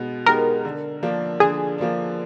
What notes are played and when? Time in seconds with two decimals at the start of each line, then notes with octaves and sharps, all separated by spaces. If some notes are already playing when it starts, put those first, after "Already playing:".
Already playing: B2 G#3 B3
0.26 G#3 B3 D#4 G4 A#4
0.65 D3
1.03 F3 A#3 D4
1.40 D3 G#4
1.78 F3 A#3 D4